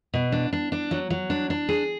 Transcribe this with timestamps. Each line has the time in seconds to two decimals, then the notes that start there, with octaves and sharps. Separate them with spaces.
0.14 B2
0.32 D4
0.53 D4
0.72 D4
0.91 F#3
1.10 F#3
1.30 D4
1.50 D4
1.69 G#4